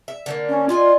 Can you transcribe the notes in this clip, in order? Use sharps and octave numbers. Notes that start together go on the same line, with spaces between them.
E5
D3 F#3 A#3
C#4
F4 D5 D#5 G#5